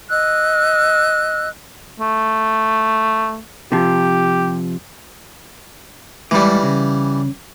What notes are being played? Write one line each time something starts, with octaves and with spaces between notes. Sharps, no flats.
D#5 E6 F#6
A3
C3 F3 G4
A2 E3 G3 G#3 B5
C#3